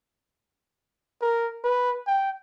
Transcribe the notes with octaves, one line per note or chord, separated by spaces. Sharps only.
A#4
B4
G5